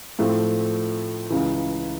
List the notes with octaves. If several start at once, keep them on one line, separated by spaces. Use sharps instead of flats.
A2 F3 A3 C4
C#2 C#3 E3